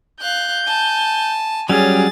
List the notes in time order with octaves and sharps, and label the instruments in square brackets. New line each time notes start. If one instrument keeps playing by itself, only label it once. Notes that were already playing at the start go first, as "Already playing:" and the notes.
[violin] F5 F#6 [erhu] G6
[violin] G#5 A5
[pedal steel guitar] F#3 G3 C#4 [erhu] G#4 [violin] A6